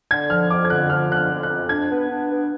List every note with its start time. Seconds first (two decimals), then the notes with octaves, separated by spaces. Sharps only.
0.11 D3 G#6
0.30 F3 F6
0.50 F2 D6
0.65 G#6
0.70 D3 F#6
0.90 F3 F6
1.10 D3 F#6
1.17 F6
1.30 F2
1.43 F#6
1.50 F2
1.69 D4 G#6
1.89 B3
2.10 D4
2.30 B3